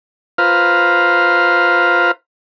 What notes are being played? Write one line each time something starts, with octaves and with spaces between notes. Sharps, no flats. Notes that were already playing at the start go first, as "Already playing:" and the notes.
F4 B4 C5 F5 A#5